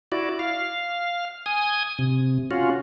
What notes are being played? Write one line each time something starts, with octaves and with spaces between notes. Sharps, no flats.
E4 F#4 D5
F5
G#5 D#6
C3
C#4 F4 F#4